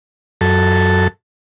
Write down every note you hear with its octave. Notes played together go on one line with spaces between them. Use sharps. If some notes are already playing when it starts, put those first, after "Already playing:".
F#2 A4